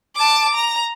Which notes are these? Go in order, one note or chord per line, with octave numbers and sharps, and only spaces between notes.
A5 D6
A#5